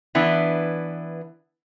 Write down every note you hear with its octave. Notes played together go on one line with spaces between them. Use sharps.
E3 B3 D4 E4